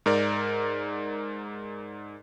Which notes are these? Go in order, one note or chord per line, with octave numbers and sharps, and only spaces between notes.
G#2 A#4 D5